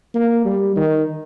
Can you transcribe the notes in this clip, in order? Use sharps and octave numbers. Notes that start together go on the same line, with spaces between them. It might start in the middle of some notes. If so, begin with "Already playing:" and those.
A#3
G3
D#3